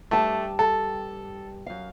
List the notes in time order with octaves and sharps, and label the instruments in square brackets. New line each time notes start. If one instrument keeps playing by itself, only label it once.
[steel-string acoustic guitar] G2 G4 A5 [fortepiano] A3
[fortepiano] A4
[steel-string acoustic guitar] F#2 F5